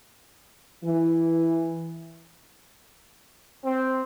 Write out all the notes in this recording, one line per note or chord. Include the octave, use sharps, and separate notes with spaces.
E3
C4